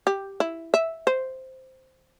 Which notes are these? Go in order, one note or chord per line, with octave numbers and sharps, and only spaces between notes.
G4
E4
E5
C5